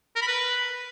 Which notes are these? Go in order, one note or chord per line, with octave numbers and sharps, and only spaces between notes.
A#4
B5
B4